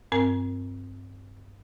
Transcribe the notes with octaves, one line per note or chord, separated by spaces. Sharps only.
G2 C4 A#4